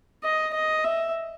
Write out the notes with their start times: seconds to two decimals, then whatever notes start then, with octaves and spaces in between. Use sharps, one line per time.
0.24 D#5
0.54 D#5
0.85 E5